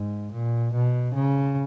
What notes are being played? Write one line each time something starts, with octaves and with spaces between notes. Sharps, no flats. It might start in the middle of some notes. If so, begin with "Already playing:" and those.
Already playing: G#2
A#2
B2
C#3